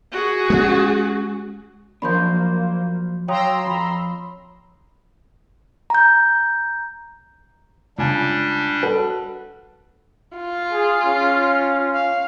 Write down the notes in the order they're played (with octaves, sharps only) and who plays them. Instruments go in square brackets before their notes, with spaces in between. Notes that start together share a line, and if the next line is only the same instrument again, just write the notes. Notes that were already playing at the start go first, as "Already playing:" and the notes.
[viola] F#4 G#4
[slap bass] G#3 A#3 C#4
[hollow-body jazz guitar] F3 F#3 D4 [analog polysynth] A#3 C5 [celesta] B5 C6 G6
[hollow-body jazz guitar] F#3 [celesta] C#5 F5 D#6 [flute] G5 [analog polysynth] A#5 C6 E6
[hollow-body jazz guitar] F2 [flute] B5
[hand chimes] A#5 G6
[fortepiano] C#2 G#5 [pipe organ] G3 D4
[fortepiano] F#4 A4 B4
[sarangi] F4
[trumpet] G#4
C#4
[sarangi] F5